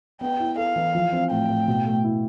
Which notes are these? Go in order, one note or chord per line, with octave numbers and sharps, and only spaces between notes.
B3 G5
E4
A4 F5
E3
F3
C4
A2 G5
A2
B2
A3
E4